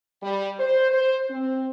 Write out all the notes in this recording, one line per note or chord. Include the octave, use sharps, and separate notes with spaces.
G3
C5
C5
C4